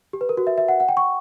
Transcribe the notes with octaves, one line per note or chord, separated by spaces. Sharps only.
G4
B4
A#4
F#4
E5
E5
F#5
F#5
G5
C#6